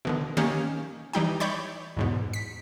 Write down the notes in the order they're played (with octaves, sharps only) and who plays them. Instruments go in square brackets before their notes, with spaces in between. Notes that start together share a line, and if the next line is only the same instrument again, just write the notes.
[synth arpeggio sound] B2 D3 D#3
D#3 A#3 C#4 G4
E3 G3 D#4 G5
C#5 D5 B5 G6
E2 G#2 B2
B6